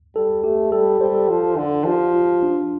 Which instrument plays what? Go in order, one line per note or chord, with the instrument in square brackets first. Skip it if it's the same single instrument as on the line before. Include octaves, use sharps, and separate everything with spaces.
[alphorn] G3 [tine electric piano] A4
[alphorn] A3 [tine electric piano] G4
[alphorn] G3 [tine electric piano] A4
[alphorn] G3 [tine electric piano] C5
[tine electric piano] A4
[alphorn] F3
D3
[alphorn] F3 [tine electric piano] G4
[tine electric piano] F4
D4